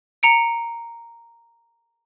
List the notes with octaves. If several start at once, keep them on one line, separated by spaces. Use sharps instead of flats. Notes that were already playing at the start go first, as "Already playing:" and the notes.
A#5 C#7 D7